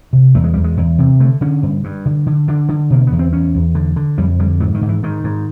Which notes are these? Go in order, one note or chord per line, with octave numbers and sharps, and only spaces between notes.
C3
E2 A3
G#3
E2 G3
G#3
E2
C3
D3 A3
D3 C#4
G2
G2
D3
D3
D3 D4
D3
B2 A#3
B3
E2
C4
E2 C#4
E2
D3
D3
F2 G3
D3 G3
G#2 F#3
D#3
G#2
E3
G#2 D#3
G#2